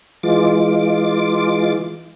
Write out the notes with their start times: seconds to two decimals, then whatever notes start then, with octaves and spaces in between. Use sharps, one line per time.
0.23 E3 G#3 F4 D6